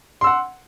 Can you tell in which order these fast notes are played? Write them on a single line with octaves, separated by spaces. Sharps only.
C6 E6 F#5